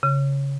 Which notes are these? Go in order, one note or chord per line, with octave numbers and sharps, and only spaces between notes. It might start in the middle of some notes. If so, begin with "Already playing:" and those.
C#3